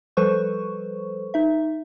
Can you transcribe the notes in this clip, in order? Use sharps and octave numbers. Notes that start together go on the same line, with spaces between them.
F3 G3 A4 B4 C5 C#6
D#4 E5